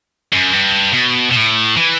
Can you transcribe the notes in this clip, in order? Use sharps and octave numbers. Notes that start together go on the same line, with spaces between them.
F#2
G2
B2
B2
A2
E3